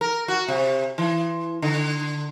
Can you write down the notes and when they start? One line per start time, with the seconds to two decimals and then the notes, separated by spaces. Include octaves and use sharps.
0.01 A#4
0.28 F#4
0.48 C3
0.98 E3
1.62 D3